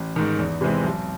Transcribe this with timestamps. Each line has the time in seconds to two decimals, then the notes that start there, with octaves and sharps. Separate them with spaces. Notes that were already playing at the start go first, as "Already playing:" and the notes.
Already playing: A1
0.16 G#2 D#3
0.38 E2
0.61 C3 E3 G#3 C4
0.83 B1